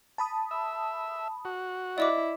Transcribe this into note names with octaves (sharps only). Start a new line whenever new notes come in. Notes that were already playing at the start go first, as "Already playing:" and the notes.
A5 B5 D#6
E5
F#4
E4 D5 D#5 D6